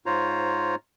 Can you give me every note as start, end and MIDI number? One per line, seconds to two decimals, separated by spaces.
0.06 0.75 44
0.06 0.75 65
0.06 0.75 72
0.06 0.75 73
0.06 0.75 82